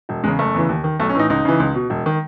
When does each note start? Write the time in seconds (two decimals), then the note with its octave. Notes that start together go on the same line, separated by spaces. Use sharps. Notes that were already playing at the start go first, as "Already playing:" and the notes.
0.09 E1
0.24 E2 C#3 G#3
0.39 F#1 A3
0.54 E2 C#3 E3
0.69 D#2
0.84 D#3
0.99 B1 A3
1.09 C#4
1.15 A2 E3 D#4
1.30 C#2 D#4
1.45 C#3 E3
1.60 C#2
1.75 B2
1.90 E1
2.06 D#3